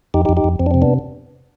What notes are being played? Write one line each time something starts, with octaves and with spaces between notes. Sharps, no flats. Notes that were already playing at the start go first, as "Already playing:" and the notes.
F2 D#4 G4
D#4 G4
F2
D#4 G4
F2
F2 C4
D4
C3 C4
B3 D4